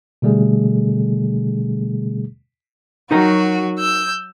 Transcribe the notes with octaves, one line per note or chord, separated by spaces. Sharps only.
B2 D3 G3 A3 G#4
F#3 D#4 F#4 A#4 A#5
E6 G6